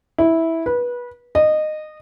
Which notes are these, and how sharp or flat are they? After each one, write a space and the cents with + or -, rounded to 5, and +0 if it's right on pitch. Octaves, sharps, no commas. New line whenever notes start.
E4 -10
B4 -20
D#5 -20